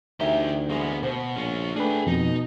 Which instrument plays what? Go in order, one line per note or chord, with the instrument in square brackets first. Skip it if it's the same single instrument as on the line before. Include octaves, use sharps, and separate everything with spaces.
[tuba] D2 [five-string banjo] E3 D#4 E5 [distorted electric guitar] G4 A#4
[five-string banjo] E3 G#3 [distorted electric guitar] A#3 B3
[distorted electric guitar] B2 [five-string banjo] C5
[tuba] A#1 [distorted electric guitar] C#4 F4
[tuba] A3 [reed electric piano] D4 B4 [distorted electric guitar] G#4 G5
[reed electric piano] F2 [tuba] B2 [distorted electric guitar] D#4